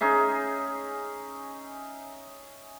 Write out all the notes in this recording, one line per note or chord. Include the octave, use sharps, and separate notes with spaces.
C#4 D#4 G#4 E5